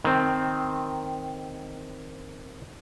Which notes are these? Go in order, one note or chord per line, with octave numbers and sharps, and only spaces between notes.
D#3 C4